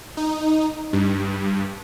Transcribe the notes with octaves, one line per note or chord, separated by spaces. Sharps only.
D#4
G2